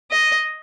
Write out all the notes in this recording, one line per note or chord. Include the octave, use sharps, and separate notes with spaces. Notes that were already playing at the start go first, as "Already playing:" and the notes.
D#5